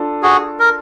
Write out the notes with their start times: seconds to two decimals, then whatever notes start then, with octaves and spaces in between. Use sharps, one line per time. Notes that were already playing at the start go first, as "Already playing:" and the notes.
Already playing: D4 F4 A4
0.23 F#4 G#4
0.59 A#4